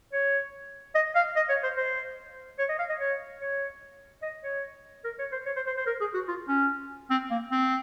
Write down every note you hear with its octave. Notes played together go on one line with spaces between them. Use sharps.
C#5
D#5
F5
D#5
C#5
C5
C5
C#5
D#5
F5
D#5
C#5
C#5
D#5
C#5
A#4
C#5
C5
C#5
C5
C5
C5
A#4
G#4
F#4
F4
C#4
C4
A#3
C4